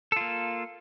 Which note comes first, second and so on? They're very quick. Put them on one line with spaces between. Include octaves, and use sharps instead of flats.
A4 F4 A#3